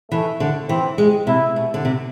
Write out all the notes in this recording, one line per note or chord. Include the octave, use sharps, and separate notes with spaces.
E3 A3
D3
E3 C4
G#3
C3 E4
B2
D3
C3